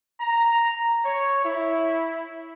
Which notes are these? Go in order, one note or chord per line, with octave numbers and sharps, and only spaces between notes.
A#5
C#5
E4